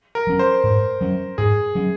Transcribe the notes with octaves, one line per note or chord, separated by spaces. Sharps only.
A#4
F#3 C#4
C5
G#2
F#3 C#4
G#2 G#4
F#3 C#4